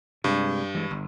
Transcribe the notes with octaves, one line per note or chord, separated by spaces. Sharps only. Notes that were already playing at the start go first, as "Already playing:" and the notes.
G2 C3 G#3
E3 G#3
G1